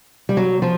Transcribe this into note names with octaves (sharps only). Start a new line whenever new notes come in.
G3
F#3
F3